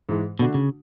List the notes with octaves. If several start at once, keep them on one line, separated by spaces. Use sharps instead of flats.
G#2 E3 G#3
B2 D3 A3 D4 F#4
C#3